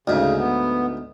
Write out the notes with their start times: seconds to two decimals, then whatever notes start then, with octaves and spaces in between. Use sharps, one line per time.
0.07 D2 G#2 C#3
0.38 B3